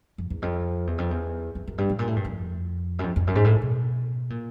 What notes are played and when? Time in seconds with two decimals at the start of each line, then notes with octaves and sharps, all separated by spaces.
0.18 F2
0.30 E2
0.42 F2
0.87 E2
0.98 F2
1.11 E2
1.55 F2
1.67 F#2
1.78 G2
1.89 A2
1.99 A#2
2.07 A2
2.16 G2
2.25 F2
2.99 F#2
3.04 F2
3.16 F2
3.27 F#2
3.35 G#2
3.44 A2
3.62 B2
4.30 A#2